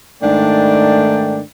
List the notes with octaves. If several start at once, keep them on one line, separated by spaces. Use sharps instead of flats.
G#2 D#3 A3 D4 D5 G5